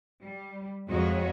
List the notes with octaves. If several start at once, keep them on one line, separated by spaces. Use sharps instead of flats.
G3
F2 G#3 F#4 C#5 D#5